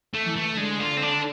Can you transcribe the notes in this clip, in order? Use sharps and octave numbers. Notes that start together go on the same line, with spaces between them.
A3
E3
A3
D3 G#3
F4
C4
D4